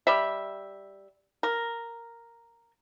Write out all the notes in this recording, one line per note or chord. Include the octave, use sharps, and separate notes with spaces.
G3 E5
A#4